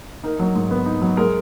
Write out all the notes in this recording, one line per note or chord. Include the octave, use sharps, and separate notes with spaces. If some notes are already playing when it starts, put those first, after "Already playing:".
D#4 A#4
F#3
G#2
B3
D#4
F#3
G#3 A#4